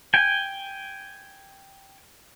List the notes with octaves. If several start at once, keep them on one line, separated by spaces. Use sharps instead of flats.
G5 G#5